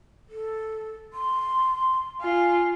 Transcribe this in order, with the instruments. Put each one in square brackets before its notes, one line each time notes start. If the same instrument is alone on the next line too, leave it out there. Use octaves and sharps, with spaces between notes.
[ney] A4
C6
[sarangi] F4 [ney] G#5